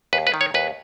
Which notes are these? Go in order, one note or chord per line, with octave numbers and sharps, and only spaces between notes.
D#2 B4
B4
D#3
C#5
D#2 B4